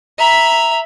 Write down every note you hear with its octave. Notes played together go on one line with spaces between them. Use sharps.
E5 A#5 B5